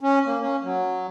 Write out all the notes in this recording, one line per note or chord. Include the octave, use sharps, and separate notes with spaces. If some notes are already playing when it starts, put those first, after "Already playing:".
C#4
A#3
C#4
F#3